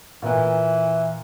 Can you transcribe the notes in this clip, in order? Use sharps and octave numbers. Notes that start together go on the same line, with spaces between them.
A#2 E3